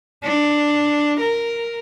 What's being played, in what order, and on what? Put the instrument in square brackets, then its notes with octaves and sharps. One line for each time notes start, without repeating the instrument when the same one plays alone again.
[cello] D4
A#4